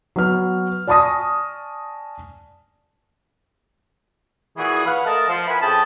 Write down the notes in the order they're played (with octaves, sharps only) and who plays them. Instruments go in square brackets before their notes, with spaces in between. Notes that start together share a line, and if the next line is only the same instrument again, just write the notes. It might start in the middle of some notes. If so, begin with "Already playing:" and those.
[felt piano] F#3 B3 F6
D5 G#5 A5 C#6 D#6 A#6
[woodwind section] A#2 E3 E4 F#4 G#4
B4 F5 F#5
A3 A#4 D#5 A5
F3
E4 A#4 B4 F#5 G#5 B5
F2 C#4 G#4 G5 A5